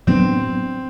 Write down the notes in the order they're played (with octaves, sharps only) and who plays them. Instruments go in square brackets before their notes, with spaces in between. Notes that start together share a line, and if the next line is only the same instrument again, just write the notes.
[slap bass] A2 F#3 B3 D4 [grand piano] C4